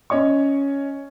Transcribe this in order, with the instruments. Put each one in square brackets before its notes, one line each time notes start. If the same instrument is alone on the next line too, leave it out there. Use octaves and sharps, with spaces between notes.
[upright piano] C#4 C#5 D#5 C#6